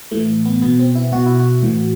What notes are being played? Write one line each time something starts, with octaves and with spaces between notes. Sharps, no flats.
A2 E3 A3
B3
B2 B3
C4
E4
B2 F#4
E4
F#4
A2 E3